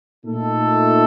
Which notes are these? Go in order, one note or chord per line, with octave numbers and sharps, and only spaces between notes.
A#2 A3 D#4 A4